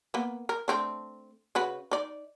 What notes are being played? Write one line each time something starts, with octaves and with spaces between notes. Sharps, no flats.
A#3 B3
A#4
A3 C4 D4
C#3 F#4 B4
D#4 D5